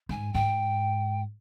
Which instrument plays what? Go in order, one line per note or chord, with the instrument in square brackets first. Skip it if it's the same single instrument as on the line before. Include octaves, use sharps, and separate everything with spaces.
[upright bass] G#2 [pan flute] G#5
[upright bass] G#2 [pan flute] G5